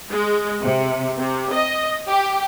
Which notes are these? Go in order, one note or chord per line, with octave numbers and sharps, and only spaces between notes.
G#3
C3
C3
D#5
G4